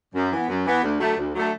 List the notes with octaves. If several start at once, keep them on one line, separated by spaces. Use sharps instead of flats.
F#2
E3 B3
F#2
E3 B3
D2
D3 F#3 A3
D2
D3 F#3 A3